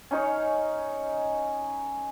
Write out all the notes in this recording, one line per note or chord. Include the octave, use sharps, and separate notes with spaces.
C#4 D#4 G#4 C#5